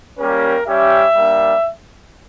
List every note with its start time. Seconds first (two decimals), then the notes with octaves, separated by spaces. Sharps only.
0.18 G3 A#3 C#4 G4 A#4
0.66 G3 C#4 G4 E5
1.15 G3 A#3 D4